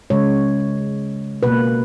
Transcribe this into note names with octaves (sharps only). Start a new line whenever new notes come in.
C#3 G#3 C#5
B2 A#3 B4